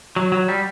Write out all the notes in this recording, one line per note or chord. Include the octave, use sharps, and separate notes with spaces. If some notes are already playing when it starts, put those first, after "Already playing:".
F#3
F#3
G3